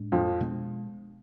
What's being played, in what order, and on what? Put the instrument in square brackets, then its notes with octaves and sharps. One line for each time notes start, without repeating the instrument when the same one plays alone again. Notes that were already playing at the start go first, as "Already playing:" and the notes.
Already playing: [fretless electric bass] A2 G#3 D4
[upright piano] F2 F3
[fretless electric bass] B2 G#3 B3 D4